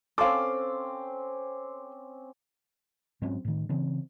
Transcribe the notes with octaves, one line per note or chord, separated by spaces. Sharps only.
C4 C#4 A4 F5 C6 D6
G#2 F#3 C4 C#4
A2 D#3
C#3 E3 C4